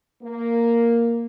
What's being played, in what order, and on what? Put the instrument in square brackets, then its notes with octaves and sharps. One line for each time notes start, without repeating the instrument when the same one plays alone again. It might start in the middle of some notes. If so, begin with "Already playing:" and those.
[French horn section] A#3